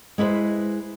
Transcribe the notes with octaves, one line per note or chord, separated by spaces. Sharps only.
G#3 E4 B4 C5